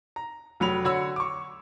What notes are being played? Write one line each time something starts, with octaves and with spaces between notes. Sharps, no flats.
A#5
F1 F#3 B5 F7
D3 F#4 C#5 B5 E6
C#6 D6